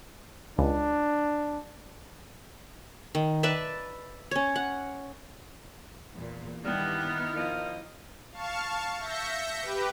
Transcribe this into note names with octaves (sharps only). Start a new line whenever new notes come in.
C#2 D4
D#3
B4 D5 E5 A5
C#4 C#5
F#5
E2 A#2
G2 D#3 G3 B3 D#4 E4 F6
F3 A#4 D#5
F5 A5 C#6
E5 G6 A#6 C#7
G4 B4